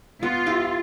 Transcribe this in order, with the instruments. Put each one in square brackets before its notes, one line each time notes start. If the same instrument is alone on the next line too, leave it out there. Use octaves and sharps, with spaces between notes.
[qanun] B3 [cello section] F4
[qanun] E4 G4